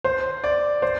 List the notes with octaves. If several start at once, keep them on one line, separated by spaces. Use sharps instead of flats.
C5
D5
C5